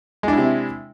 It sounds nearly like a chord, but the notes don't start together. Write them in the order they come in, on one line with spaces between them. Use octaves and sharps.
G#3 D4 E4 C3